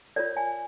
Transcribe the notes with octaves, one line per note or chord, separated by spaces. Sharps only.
F4 A#4 C#5 D5
G#5